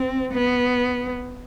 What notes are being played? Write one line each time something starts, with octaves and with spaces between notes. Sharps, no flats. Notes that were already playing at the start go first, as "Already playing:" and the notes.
Already playing: C4
B3